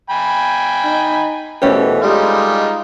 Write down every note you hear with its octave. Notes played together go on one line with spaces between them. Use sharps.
G5 G#5 B5
D#4
C2 B2 E3 A3 C#4 G4
G3 G#3 D#4 F4